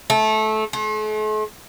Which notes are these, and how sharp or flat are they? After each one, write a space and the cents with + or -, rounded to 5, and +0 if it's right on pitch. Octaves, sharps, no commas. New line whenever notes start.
A3 -20
A3 -45